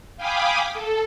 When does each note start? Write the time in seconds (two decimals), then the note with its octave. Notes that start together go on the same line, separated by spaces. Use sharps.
0.17 F5 G5 G#5 B5 D6 D#6
0.74 A4